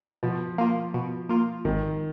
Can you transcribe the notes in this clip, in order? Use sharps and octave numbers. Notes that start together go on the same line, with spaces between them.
B2 F3
A#3 F4
B2
A#3 F4
G#1 D#3